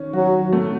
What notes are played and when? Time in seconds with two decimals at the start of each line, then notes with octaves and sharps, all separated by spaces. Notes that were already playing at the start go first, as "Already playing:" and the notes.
Already playing: D#3 C#4
0.13 F#3 F#4
0.52 A3